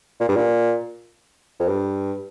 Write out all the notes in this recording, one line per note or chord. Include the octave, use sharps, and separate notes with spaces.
A#2
G2
A#2
F2
G2